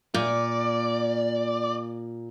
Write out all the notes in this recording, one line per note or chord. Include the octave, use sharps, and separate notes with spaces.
A#2 D5